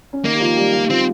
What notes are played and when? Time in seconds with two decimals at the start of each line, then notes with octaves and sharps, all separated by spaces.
0.13 C#4
0.24 D#3 A#3 D#4
0.34 G4
0.40 F3 F4
0.56 G3 G4
0.73 F3 F4
0.90 F3 C4 F4